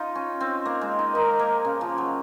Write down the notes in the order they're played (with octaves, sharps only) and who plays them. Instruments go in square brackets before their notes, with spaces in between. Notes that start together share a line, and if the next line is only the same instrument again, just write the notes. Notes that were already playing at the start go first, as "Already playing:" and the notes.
Already playing: [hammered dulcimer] D#4 F4
C#4
C4
A#3
G#3
D#4
[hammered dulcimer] D#4 [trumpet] A#4
[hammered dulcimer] A#3
C#3
F3
F#3